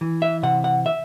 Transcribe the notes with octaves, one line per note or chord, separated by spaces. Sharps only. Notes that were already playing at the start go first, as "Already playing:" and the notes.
E3
E5
C3 F#5
F#5
E5